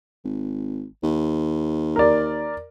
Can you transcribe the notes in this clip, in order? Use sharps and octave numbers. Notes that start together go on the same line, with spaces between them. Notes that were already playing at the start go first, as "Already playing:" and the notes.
G#1
D#2
A#4 D5